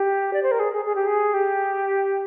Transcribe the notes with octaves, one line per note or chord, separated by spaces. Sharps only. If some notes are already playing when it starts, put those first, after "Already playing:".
Already playing: G4
D5
C5
A#4
G#4
G#4
G#4
G4
G#4
G4